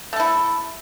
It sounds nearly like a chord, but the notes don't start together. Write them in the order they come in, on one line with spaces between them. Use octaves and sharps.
A3 A4 E4